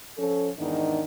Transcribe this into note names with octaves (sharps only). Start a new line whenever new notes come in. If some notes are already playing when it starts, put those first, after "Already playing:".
F3 C#4 A4
E2 G#2 D#3 B3 D4 D#4